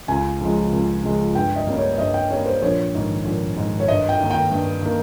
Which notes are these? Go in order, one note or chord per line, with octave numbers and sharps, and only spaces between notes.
C#2 G#5
C#3 F3 G#3
C#2
C#3 F3 G#3
G2 G5
D#5
G3 A#3 C#4
C#5
G2 D#5
G5
G3 A#3 C#4 C#5
C5
A#1 C#5
G#2 D#3
A#1
G#2 D#3
C#5
G2 D#5
G5
D#3 A#3
G5
G2
D#3 A#3